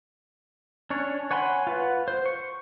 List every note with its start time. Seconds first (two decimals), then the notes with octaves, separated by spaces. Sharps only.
0.90 C#4 D4 C#5
1.31 C#5 F#5 G#5 B5 C6
1.67 F4 B4 F#5
2.08 C5
2.26 C#6